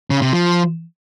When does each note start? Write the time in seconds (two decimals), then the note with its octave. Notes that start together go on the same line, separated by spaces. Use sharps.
0.10 C#3
0.22 C3
0.33 F3